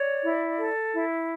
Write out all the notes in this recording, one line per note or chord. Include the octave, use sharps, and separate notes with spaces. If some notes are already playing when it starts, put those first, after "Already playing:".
Already playing: C#5 D5
E4
A4
E4